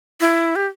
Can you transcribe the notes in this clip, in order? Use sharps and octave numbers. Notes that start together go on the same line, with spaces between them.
E4
G4